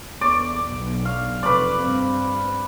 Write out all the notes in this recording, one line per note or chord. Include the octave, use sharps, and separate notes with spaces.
E2 D5
B1
F5
F1 B4 D5
G2 C4